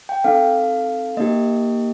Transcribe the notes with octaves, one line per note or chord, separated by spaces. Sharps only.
G5
C4 D#4 A4 F5
A#3 D#4 G4 D#5